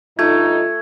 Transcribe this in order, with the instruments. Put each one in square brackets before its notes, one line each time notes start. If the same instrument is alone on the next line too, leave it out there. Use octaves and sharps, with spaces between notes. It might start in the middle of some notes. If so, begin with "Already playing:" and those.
[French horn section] G2 D3 D#4 [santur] A3 [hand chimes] F4 [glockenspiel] G#6